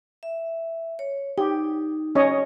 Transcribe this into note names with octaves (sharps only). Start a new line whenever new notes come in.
E5
C#5
D#4 G4
C#4 C#5 D#5